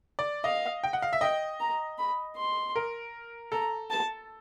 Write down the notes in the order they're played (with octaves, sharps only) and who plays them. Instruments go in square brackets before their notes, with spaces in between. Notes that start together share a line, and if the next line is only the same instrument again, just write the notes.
[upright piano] D5
[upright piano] D#5 [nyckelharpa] F5
[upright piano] G5
F#5
F5
E5
[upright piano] D#5 [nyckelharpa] G5
[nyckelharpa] A#5
B5
C6
[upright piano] A#4
[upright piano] A4 [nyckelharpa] A#5
[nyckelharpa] A5